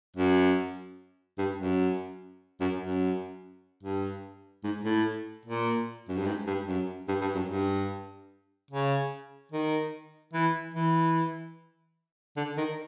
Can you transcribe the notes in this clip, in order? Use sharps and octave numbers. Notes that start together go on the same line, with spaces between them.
F#2
G2
F#2
F#2
F#2
G2
G#2
A2
A#2
F#2
G2
G#2
G2
F#2
G2
G2
F#2
G2
C#3
D#3
E3
E3
D3
D#3